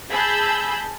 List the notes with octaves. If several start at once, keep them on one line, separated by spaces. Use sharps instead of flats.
G#4 A5 B5 E6 G6